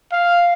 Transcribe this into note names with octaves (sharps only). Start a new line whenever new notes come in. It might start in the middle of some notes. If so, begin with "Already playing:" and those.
F5